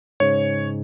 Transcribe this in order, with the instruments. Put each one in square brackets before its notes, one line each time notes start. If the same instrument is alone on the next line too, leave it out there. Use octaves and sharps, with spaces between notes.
[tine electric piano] G#2 C#3 [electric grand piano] C#5